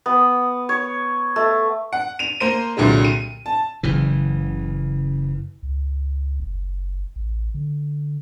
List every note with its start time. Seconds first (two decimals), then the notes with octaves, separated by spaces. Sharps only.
0.06 B3
0.69 C#5
1.36 A3
1.93 F#5
2.19 D#7 F7
2.40 A#3 C5 D#7
2.77 C2 A#2 D3 F#3 G#3
3.05 D#7
3.46 A5
3.83 F#1 C#3 E3
5.63 C#2
6.40 F#1
7.16 A1
7.54 D3